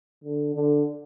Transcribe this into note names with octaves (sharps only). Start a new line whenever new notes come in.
D3
D3